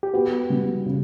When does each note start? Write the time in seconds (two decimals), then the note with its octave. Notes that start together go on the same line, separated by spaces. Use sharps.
0.03 G4
0.13 B3 F#4
0.50 G3
0.86 C#3